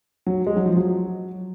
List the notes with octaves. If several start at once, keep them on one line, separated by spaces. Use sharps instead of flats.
F#3
G#3
F#3
F3
F#3